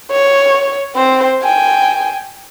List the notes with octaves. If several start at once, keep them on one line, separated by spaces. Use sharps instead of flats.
C#5
C4 C5
G5 G#5